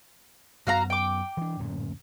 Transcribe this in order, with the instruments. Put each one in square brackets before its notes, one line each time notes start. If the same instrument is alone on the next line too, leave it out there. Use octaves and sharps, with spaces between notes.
[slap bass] F#2 B3 [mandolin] F#4 F5 A#5
[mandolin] G5 D6
[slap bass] E3 D4
D1 F#2 A#2